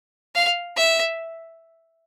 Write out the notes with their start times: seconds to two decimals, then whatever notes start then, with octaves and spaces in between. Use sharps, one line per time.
0.35 F5
0.76 E5